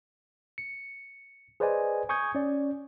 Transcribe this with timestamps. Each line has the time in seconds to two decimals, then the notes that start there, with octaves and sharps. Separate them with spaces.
0.58 C#7
1.60 G#4 B4 C5 D5 D#5 G#5
2.09 G#5 C#6 D#6 G6 G#6
2.35 C#4 D5